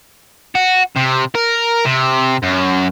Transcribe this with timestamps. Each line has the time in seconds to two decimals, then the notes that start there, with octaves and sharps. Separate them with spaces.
0.55 F#4
0.96 C3
1.35 A#4
1.86 C3
2.43 F#2